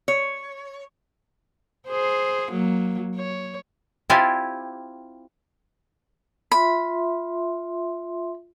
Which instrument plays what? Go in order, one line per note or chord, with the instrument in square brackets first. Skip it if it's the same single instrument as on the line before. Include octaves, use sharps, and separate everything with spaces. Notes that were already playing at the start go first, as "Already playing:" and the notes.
[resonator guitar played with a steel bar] C#5
[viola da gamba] G#4 C5
F#3 A#3
C#5
[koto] C4 E4 F4 G4 D5 G#5
[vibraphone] F4 E5 C6 [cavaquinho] B5